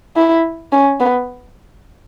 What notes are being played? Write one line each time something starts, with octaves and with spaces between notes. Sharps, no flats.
E4
C#4
B3